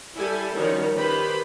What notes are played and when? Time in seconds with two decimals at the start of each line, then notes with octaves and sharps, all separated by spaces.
0.15 G3 E4 G4 A4 G#5
0.55 D#3 F3 G3 C#4 F#4 A#4
0.95 D#3 G4 B4 C5 B5